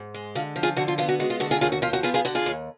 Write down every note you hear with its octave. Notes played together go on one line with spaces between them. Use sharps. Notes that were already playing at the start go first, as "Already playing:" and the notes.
Already playing: G#2
G#3
D3 F4
F3
F4 G#4
D3 F#4
F4
B3 F4
F#4
G#3 F#4
F4
D3 F#4
F4 G#4
D#2 F4 G#4
F#4
F3 F4
F#4
B3 F4 G#4
F4 G#4
D3 F#4
F4 G#4
D#2